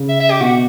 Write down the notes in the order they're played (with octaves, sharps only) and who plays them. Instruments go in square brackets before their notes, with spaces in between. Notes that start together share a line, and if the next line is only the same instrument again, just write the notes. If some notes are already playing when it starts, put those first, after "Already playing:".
Already playing: [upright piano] C#3
[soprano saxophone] E5
E5
G4
[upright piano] B2 [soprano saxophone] F#4